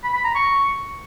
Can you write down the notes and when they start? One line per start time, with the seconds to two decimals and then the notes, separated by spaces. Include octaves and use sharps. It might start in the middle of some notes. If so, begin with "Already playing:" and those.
0.04 B5
0.14 B5
0.25 A#5
0.35 C#6